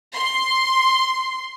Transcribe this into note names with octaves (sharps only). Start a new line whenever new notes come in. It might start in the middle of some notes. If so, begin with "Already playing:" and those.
C6